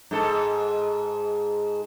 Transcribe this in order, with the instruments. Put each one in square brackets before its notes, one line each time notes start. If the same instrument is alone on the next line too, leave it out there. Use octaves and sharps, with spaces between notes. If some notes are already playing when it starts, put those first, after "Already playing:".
[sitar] G#2 A4